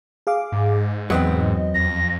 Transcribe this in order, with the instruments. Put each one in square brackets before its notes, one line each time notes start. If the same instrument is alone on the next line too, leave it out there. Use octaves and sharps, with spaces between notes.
[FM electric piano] G#4 F5 D6
[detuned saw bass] G#2
[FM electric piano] E2 D#5 [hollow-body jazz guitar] F#3 B3 C4
[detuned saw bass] F2 [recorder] A#6